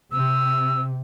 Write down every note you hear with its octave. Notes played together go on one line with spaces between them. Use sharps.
C3 E6